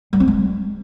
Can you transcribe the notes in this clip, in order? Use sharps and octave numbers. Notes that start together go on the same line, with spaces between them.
G3
C4
G#3